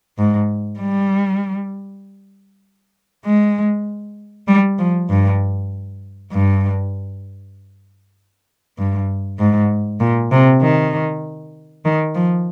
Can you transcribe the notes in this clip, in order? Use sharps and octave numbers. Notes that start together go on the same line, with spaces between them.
G#2
G3
G#3
G3
F3
G2
G2
G2
G#2
A#2
C3
D#3
D#3
F3